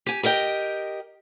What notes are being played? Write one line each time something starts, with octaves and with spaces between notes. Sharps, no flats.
G4 G#5
G4 A#4 D#5 G5